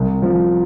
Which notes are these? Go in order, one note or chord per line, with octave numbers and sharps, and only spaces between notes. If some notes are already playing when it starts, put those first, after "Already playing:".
Already playing: C2
F3